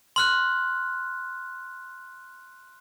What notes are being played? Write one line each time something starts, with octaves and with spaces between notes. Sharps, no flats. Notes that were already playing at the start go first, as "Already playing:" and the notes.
C6 F6 F#6